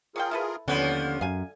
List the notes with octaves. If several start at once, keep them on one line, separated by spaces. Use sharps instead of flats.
F4 G#4 A#4 C#5 F5 G5
E4 A4 B4
D#2 D3 F3 B3 C#4
F#2 F5 G#5